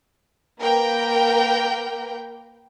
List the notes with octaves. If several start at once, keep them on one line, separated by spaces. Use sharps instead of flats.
A#3 A#4 B4 G5